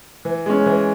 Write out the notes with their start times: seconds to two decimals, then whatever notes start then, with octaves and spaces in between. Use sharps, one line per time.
0.25 E3
0.46 G#3 C#4
0.66 E3